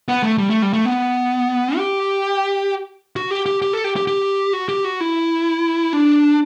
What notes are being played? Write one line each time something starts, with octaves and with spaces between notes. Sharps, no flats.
B3
A3
G3
A3
G3
A3
B3
G4
F#4
G4
G4
G4
A4
G4
G4
G4
F#4
G4
F#4
E4
D4